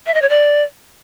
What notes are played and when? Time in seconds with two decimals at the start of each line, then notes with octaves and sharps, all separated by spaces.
0.06 E5
0.14 D#5
0.22 C#5
0.29 D5